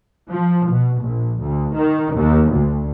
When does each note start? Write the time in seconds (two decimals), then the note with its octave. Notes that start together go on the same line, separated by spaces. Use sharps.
0.30 F3
0.70 B2
1.02 A#1
1.42 D2
1.75 D#3
2.16 D#2
2.53 D2